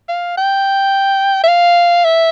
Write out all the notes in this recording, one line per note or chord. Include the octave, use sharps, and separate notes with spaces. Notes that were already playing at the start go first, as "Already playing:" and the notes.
F5
G5
E5
F5
E5